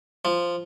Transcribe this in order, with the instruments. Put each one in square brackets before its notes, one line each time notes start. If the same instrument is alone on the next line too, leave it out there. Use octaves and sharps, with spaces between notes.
[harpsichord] F3